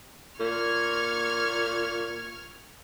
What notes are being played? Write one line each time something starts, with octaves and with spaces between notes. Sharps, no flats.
A#2 C#6 F6 G#6